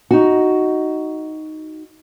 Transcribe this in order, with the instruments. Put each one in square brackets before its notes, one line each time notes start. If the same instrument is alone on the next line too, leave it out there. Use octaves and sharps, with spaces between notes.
[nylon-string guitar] D#4 F#4